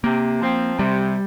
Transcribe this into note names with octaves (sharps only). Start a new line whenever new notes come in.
C3 A#3
F3 C4
C3 G3